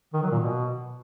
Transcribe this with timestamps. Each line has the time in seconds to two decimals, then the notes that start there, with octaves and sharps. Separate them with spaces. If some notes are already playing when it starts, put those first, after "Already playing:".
0.13 D#3
0.22 F#3
0.31 A#2
0.40 B2